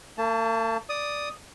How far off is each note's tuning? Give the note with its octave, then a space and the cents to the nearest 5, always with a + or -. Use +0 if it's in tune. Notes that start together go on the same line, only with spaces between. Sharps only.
A#3 -45 A5 +0
D5 +0 D#6 +0